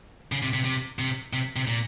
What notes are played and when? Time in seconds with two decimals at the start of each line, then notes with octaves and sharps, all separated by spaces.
0.32 C#3
0.43 C3
0.54 C3
0.65 C3
0.99 C3
1.33 C3
1.56 C3
1.67 A#2